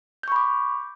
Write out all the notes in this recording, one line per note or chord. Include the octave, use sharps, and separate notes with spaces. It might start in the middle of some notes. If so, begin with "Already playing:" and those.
B5 C#6 D6 G6